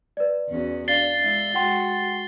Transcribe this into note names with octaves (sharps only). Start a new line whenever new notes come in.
B4 D5
E2 C#4 F#4
D4 D5 F5 A6 C7 G7
G#3 E4
G#3 F#4 F#5 G5 C6